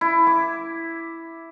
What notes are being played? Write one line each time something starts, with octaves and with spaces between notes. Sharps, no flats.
E4
D6